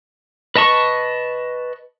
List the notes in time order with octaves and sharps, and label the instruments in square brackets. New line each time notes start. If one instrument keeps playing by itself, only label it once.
[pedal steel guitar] B4 D#5 A5 C#6